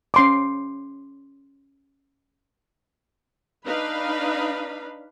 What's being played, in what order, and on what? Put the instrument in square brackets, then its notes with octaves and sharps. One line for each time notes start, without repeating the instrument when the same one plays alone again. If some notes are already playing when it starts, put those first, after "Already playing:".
[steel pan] C#4 C6 D6
[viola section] D4 D#4 B4 F5 B5